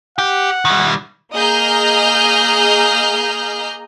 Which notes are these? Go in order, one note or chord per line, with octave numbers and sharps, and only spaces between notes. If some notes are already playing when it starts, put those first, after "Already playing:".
G4 F#5
D#3 G3
A#3 G#4 D#5 A#5 F6 G6